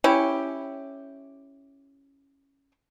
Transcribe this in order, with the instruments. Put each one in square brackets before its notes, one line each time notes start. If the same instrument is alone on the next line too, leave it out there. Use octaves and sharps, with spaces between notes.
[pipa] C#4 E4 G4